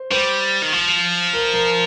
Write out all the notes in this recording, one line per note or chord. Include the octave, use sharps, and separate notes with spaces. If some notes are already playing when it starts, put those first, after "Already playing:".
Already playing: C5
G3 C5
D#3
F3
A#4
A#4